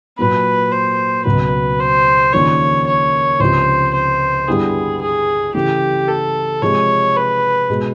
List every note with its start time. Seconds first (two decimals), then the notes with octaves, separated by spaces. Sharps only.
0.18 A#2 F#3 A#3 B4
0.72 C5
1.25 C#2 B2 F#3 B4
1.80 C5
2.33 D#2 C#3 F3 A#3 D4 C#5
2.87 C#5
3.40 C#2 C3 F3 C5
3.94 C5
4.47 G2 D3 G3 B3 E4 G#4
5.02 G#4
5.54 C#3 E3 A3 G4
6.08 A4
6.62 C3 F3 G#3 C#5
7.16 B4
7.70 B2 G#3